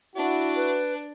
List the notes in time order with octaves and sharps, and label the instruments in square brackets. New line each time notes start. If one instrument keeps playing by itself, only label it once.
[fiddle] D4 [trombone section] E4 F#4
[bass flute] B4